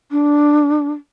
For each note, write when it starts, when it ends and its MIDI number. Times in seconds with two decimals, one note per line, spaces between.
0.11 0.91 62